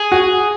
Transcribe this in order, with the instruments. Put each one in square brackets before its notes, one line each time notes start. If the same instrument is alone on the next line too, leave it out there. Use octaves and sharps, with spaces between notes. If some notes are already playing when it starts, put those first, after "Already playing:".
Already playing: [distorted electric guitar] G#4
[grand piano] F#4